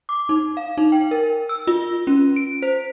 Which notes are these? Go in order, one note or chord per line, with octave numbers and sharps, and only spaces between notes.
D6
D#4
F5
D#4
G5
A#4
E6
F4
C#4
D7
C5